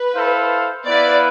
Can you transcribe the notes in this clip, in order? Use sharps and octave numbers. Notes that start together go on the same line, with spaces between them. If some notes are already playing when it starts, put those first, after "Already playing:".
Already playing: B4
E4 A4 C5 F5
B3 E4 B4 D5 F5